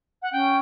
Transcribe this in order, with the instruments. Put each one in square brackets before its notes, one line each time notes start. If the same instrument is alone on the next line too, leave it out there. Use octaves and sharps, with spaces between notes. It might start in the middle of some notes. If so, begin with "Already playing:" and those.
[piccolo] F#5
[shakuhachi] C#4 [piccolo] G5